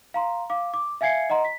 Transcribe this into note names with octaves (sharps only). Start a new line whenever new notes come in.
F5 A#5 C6
F5 D6
D6
E5 F5 G#5 G#6 C7 C#7
D#5 F#5 A#5 C6
B6